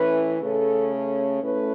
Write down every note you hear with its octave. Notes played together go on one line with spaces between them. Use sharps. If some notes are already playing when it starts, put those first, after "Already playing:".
Already playing: A2 E3 C#4 B4
C#3 A3 C#4 A4
A4
A2 A3 C#4 B4